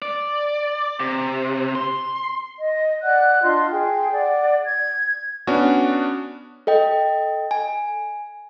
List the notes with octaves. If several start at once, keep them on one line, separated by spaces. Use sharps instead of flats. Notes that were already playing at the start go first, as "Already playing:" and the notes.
D5
C3
C6
D#5
D5 F#5 F#6
D4 F4 D#5 C6
G#4 G5
D5 F#5
G#6
B3 C#4 D4 F#4
A4 D#5 G5
G#5